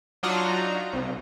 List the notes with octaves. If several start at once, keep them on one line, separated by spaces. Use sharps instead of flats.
F#3 D4 D#4 F4 F#4 A#5
C2